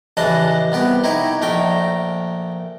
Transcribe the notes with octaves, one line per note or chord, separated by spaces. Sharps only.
A1 C#3 E3 D4 D#5 A5
C2 B3 G4
D#4 E4 G4 C#5
A#1 A3 A#4 G5